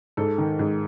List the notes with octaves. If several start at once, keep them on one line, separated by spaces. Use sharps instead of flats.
G#2 A4
D#3
G#2